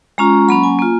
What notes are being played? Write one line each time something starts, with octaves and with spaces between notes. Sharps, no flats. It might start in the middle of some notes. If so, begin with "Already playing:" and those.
G#3 C#4 F4 A#5
F#3 A#3 C#4 B5
G#5
A#3 F4